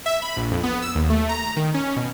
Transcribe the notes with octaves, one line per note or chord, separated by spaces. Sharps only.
E5
B5
A#1
F2
B3
E6
D#2
A3
A#5
D#3
C#4
B2